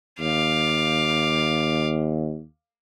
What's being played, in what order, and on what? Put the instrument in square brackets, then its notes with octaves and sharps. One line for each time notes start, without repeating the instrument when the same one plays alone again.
[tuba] D#2 [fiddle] F5 D6